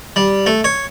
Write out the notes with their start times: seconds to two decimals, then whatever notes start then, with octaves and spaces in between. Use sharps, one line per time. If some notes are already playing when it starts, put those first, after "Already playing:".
0.16 G3
0.46 A3
0.64 C#5